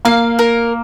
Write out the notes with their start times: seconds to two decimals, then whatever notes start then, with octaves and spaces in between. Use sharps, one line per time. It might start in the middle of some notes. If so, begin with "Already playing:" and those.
0.05 A#3 F5
0.39 A#4